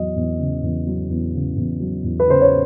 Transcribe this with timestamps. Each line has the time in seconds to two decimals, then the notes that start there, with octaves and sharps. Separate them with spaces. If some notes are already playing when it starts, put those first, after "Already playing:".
Already playing: E2 F#3 D#5
0.16 E2
0.39 C#3
0.62 E2
0.87 F#3
1.09 E2
1.34 C#3
1.56 E2
1.80 F#3
2.04 E2
2.20 B4
2.27 C#3 C5
2.41 C#5